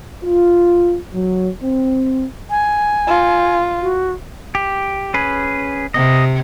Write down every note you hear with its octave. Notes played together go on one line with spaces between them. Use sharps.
F4
F#3
C4
G#5
F4
F#4
G4
C#4 G#4 B4
C3 D#5